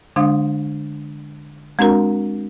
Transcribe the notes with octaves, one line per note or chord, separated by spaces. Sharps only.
D3 G#3 D4 F5 D#6
G#3 C4 D4 F#4 A#4 A#5